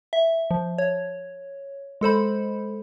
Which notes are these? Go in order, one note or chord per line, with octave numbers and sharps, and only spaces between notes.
E5
F3
C#5
G#3 A4 C5 B5